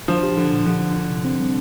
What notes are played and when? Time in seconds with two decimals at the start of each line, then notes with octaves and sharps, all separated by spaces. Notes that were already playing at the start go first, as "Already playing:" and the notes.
0.08 F3 D4
0.23 G4
0.37 D3 F3
0.52 A#2
0.66 D3 F3
0.81 F3
0.96 D4
1.10 C3
1.25 C4
1.39 G3